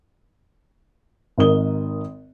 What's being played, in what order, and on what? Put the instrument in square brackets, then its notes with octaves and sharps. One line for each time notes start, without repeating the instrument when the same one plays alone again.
[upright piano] G#1 D#3 A#4 D#6 G7